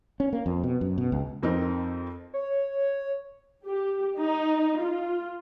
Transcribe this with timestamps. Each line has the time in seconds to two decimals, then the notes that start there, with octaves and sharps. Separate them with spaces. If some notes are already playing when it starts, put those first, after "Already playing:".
0.20 C#4
0.33 A#3
0.46 F2
0.64 B2
0.81 F#2
0.98 B2
1.12 C#2
1.43 F2 C4 D#4 A#4
2.34 C#5
3.67 G4
4.18 D#4
4.80 F4